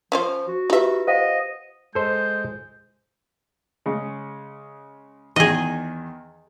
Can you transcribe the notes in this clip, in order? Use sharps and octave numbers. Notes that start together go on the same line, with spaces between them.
F3 C#4 F4 C5
F#4
D#4 F4 G4 B4 E5
C5 D#5 F5 F#5
G#3 A4 C5 G6
C#3 G#3
E2 D#3 G#4 D#5